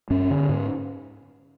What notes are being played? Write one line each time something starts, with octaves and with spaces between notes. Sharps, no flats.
G2 C#4
D3
G#2